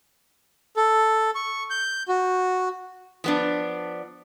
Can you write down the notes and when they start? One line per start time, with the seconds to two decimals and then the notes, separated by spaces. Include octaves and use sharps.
0.76 A4
1.35 C#6
1.70 G6
2.08 F#4
3.24 F3 B3 D4